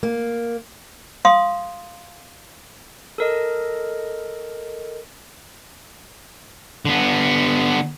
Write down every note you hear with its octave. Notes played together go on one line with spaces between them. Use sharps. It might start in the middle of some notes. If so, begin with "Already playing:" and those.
A#3
F5 C6 D#6
A4 A#4 D#5
D3 B3